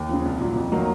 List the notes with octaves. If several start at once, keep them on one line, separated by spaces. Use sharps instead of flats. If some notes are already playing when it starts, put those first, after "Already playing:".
Already playing: D#2
C#3 F3
C2
A#2 F#3
F2
D#3 F#3 A#3